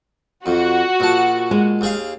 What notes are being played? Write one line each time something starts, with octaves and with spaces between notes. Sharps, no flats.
F2 F#4
A#1 A5
G#3
D#2 G#4 F5